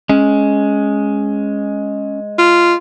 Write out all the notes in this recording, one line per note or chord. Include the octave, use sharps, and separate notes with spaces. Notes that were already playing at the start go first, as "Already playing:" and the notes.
G#3 C#4
F4